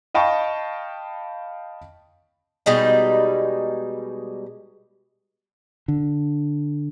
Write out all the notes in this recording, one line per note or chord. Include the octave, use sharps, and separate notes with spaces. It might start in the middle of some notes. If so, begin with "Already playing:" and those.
D#5 F5 G5 A5 B5 C#6
B2 G3 G#3 D#4
D3